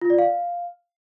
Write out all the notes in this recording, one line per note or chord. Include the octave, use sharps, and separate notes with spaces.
F4
D5
F5